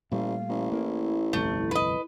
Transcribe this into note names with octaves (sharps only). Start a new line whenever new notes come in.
A1 A#2 G3 A3 F5
A1
A#3 E4
G1 C2 F2 A3
B4 D#5